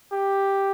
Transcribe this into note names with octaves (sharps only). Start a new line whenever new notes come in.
G4